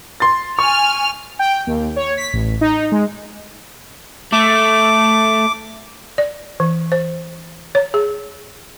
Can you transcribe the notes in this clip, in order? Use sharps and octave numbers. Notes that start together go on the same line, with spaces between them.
C6 A6
G#5 C#6 F6
G5
D#2
C#5
B6
A1
D#4
G#3
A3 D6
D5
E3
C5
C#5
G#4